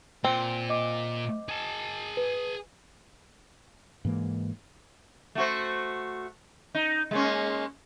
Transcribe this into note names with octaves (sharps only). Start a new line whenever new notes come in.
A#2 C4
D#5 D6
G#4 A5
B4
G#2 E3 A#3
A3 F#4 C5
D#4
G#3 A#3 C#4